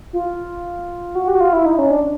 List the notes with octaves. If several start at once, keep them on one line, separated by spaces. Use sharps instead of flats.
F4
F#4
G4
F#4
F4
E4
D#4
C#4
D4